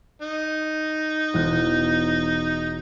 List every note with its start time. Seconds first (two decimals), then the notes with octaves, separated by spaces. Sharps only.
0.22 D#4
1.34 E1 F#6